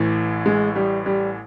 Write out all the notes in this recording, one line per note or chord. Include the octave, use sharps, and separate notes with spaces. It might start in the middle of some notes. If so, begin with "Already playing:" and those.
Already playing: A1 A2 E3
G#3
G3
G3